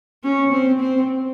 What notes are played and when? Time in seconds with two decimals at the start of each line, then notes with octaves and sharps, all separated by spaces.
0.23 C#4
0.51 C4
0.80 C4